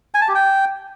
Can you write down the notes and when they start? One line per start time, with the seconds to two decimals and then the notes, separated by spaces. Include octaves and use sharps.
0.14 G#5
0.21 A5
0.28 G4
0.35 G5